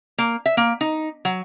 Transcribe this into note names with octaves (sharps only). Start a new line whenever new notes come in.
A#3
E5
A#3
D#4
F#3